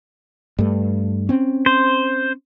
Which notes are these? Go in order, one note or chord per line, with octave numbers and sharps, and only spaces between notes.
G2 A3
C4 C#4
C5